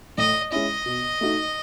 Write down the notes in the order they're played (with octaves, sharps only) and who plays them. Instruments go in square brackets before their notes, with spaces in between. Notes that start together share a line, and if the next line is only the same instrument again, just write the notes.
[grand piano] A2 [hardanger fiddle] D#5
[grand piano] G#3 C#4 E4 [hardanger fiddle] D#5
[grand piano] B2
A3 D#4 F#4